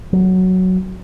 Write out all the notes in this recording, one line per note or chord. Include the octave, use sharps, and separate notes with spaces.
F#3